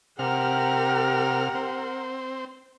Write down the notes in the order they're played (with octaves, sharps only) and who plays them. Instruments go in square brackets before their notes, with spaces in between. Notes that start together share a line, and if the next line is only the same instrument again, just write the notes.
[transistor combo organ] C3 F6 [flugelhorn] G4 [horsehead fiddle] A#4 F#5
[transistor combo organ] C4